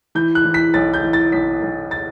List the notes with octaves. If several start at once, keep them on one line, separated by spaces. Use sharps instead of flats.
E3 G6
F#6
E3
B6
B1 A6
G6
E3
A6
B1 B6
B1
A6